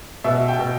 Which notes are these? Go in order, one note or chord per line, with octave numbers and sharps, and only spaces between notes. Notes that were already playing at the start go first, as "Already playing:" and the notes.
B2 E5
G5
B2